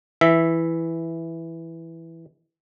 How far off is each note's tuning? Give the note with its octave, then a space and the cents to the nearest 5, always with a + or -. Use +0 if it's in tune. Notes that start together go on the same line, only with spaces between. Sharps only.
E3 +0 E5 +0